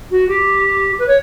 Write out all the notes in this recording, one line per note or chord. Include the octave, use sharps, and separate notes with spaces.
F#4
G4
B4
C#5